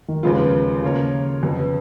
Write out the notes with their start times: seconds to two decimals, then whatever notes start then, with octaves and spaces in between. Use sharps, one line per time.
0.08 D#3
0.23 D#2 C#3 F3 G#3 B3 F4
0.38 D#3
0.82 C#3 F3 A#3 F4 A#4 C#5
1.43 F2 F3 B3